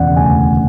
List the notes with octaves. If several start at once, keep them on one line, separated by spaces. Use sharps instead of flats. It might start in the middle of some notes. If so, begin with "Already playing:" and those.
Already playing: E1 C#3 E3 D5 F#5
D2 G#5